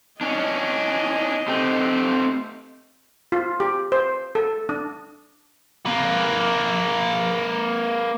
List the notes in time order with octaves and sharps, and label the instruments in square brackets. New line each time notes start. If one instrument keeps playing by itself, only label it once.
[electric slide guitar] C#4 D4 [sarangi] D#5
[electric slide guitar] A3 C4 G4
[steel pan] F4
G4
C5
A4
D4
[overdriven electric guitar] A#3 B4